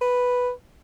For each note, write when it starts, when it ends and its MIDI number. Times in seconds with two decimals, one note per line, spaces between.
0.01 0.50 71